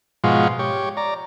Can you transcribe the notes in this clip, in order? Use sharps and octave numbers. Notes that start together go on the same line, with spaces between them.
G#2 B2 F3 G#3 F4 F#4
G4 C#5
D5 A#5